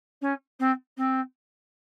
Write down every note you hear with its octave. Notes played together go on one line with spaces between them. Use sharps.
C#4
C4
C4